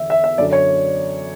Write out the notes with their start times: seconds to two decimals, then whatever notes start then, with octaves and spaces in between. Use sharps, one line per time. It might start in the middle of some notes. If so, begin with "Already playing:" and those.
Already playing: E2 D3 E5
0.10 E5
0.24 E5
0.38 F#2 D3 D5
0.53 C#5